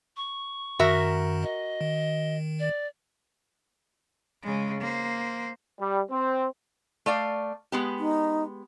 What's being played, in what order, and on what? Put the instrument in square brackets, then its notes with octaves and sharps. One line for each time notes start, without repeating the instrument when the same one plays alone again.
[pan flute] C#6
[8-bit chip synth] F#2 D#3 [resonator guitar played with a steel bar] F#4 A#4 E5
[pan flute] D#5
[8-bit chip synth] D#3
[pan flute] D5
[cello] C#3 G#3
A#3 C5
[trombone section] G3
C4
[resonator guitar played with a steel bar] A3 D5 F5
G#3 B3 G4
[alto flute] D#4